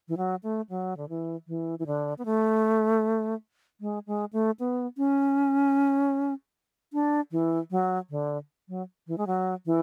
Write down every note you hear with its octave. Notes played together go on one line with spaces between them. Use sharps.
E3
F#3
A3
F#3
D3
E3
E3
E3
D3
B3
A3
G#3
G#3
A3
B3
C#4
D4
E3
F#3
D3
F#3
E3
G#3
F#3
E3